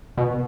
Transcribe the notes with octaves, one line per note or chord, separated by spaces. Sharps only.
B2